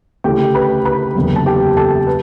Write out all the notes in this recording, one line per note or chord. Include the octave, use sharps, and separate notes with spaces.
D2 C#3 E3 A3 G4 G5
B4 B5
B4 B5
F#1 E2 D3 F#3
A5
G4 G5
A4 A5
B4